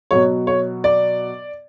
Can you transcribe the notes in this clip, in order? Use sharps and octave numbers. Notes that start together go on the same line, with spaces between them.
B2 F#3 C#5
C#5
D5